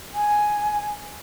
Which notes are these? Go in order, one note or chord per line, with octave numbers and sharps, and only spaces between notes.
G#5